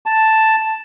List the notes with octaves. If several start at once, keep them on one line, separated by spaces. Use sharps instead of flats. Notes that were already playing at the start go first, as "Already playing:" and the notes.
A5